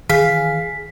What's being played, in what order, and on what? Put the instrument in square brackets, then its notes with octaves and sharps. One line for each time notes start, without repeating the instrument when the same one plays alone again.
[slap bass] D#3 E3 [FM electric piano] G#4 [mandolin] F5 [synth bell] B6